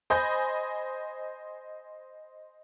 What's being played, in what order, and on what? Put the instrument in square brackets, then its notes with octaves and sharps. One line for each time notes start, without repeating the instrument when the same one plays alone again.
[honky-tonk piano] C5 D#5 G#5 B5 G6